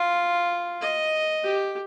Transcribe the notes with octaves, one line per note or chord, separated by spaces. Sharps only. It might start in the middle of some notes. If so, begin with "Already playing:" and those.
Already playing: F4
D#5
G4